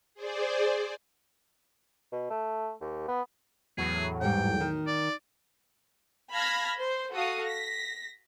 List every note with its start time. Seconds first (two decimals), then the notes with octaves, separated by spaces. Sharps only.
0.14 G#4 C5 D5
2.12 B2
2.30 A3
2.81 D#2
3.08 B3
3.77 E2 A2 F#3 G#4
4.21 G#2 G3 G5
4.60 D#3
4.87 D5
6.32 F5 A5 B5 F6 G#6 A#6
6.78 C5
7.13 F#4 A4 F5 D#6
7.43 A#6 B6